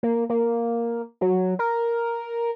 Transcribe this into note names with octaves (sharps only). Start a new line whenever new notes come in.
A#3
A#3
F#3
A#4